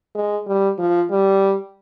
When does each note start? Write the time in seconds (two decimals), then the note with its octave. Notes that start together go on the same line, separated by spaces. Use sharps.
0.15 G#3
0.47 G3
0.79 F3
1.10 G3